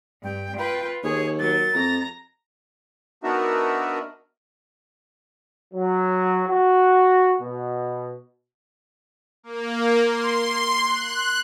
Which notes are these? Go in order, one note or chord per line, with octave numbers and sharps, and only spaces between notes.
G2 G5
F4 B4 G5
D#2 G#4 C#5
F#3 A#4 A6
F2 A#5 A#6
B3 D4 D#4 F#4 A#4 E5
F#3
F#4
B2
A#3
C6
F#6